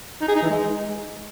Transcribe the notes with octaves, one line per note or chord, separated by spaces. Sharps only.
D#4
G#4
D#4
E3
G#3